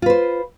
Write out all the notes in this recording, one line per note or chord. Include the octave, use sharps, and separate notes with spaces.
F4 B4 C5